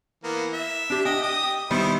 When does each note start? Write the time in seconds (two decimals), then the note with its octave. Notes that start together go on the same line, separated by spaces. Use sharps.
0.24 E3 A#3 B3
0.53 E5
0.90 D4 G4
1.05 D#5 G5
1.22 G4 D#6
1.70 D#3 G3 B3 E4 C5